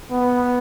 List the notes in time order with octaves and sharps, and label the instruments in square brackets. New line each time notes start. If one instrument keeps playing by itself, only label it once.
[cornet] B3